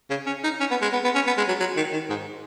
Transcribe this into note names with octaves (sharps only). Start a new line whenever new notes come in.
C#3
C#4
D#4
C#4
B3
G#3
B3
B3
C#4
B3
G#3
F#3
F#3
D#3
D#3
G#2